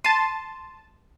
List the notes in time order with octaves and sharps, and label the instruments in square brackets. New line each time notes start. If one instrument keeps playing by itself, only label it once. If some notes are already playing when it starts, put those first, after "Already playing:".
[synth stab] A5 D#7 [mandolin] C6